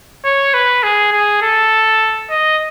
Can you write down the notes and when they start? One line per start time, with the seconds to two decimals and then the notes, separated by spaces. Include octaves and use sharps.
0.24 C#5
0.54 B4
0.83 G#4
1.12 G#4
1.42 A4
2.30 D#5